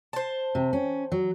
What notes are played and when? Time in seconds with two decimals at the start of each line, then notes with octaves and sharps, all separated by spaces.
0.13 C5 A5
0.55 C3
0.73 C#4
1.12 F#3